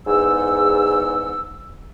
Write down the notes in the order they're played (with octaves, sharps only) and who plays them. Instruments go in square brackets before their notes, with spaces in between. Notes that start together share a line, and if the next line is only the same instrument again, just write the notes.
[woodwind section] E2 G#2 E6